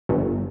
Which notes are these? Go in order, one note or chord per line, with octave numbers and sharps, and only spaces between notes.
G1